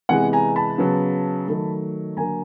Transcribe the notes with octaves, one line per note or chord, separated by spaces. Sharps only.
C3 E3 G#3 B3 F#5 G#5
G#5 A#5
A5 B5
C#3 F#3 B3
D#3 F#3 A3
D3 F#3 A#3 G#5 A#5